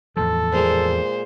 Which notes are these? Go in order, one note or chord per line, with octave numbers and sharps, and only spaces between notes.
E2 A2 F3 A4
A#2 G#3 A#3 C5